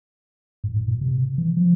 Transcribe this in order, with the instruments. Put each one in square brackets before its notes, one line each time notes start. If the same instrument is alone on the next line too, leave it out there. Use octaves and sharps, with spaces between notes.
[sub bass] G#2
G#2
A#2
C3
E3
F3